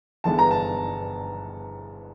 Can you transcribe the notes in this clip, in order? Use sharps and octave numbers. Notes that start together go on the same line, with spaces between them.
G1 G2 E3 G#3 B3 A5
A#5
A5